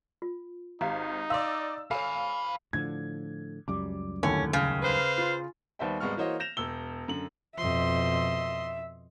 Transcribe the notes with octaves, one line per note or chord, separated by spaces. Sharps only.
F4
G#1 D#4 G4 F5 A#5
D5 F5 C6 E6
A4 C#5 F5 G#5 B5
A2 D3 F3 G#6
C#2 F#2 G3 D6
D#2 A2 D3 C#4
C#3
B4 C5 F5
F4
D#2 G3 B3 C5 E5 G5
G#1 G3 G#3 B3 C#6 F6
E3 A#3 F#4 C5 C#5 D#5
G6 A#6 E7 F7
E1 E6 G7
F#2 D3 F#7
F2 B2 D#5 E5 C6